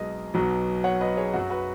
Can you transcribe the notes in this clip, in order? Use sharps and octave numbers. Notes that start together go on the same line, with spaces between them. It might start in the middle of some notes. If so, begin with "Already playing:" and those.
Already playing: B1 B2 G#3 D#5
B1 B2 F#3
C#5 F#5
B4 D#5
G#4 C#5
F#2 F#3 F#4
F#4 B4